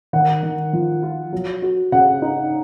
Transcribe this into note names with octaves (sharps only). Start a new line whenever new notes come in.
D#3 F#5
D#3
F3
F4
F#3
F#4
C#3 F#5
D#4